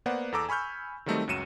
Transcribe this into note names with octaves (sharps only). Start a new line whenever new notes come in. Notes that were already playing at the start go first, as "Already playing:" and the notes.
A#3 B3 C5 D5 F#5
E2 A4 A#5 D6 E6
G#5 B5 C#6 F6 G6
D#3 F#3 G3 A3 C4 D#4
C#2 F#2 F#3 C#7 D#7 E7